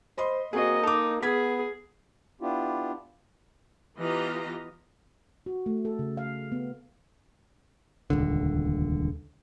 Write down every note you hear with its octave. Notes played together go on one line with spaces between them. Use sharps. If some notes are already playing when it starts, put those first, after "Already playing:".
C5 D#5 B5 C6
A#3 C4 F#4 G#4 D#5
D#4 A4 D6
B3 G#4 G#6 B6
B3 D4 E4 F4 G4
E3 B3 F4 G4 D#5 A#5
F#4
A3
A4
C#3
F5
B3
D#1 C#2 D3